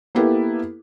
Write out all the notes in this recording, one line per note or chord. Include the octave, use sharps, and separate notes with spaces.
A#3 B3 E4 G4 A4 B4